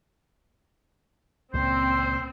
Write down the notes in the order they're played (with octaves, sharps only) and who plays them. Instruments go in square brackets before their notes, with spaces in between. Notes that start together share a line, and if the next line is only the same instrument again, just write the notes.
[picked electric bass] C#2 A#2 [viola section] C4 [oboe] C5